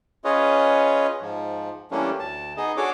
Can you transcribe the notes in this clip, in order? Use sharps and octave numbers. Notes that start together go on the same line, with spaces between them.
C#4 F4 G#4 B4 C#5 D#5
G#2 F3
E3 G3 A3 A#3 C#4 D4
D2 A5
B3 D#4 G#4 D#5
D4 F#4 G#4 A4 C#5 D6